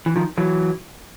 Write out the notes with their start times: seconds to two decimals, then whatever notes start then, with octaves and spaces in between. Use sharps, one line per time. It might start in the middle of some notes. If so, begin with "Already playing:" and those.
0.06 E3
0.16 D#3 F3
0.37 E3 F#3